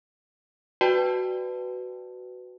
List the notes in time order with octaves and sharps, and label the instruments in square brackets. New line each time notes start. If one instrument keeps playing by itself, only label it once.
[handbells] F#4 B4 D5 G5 A5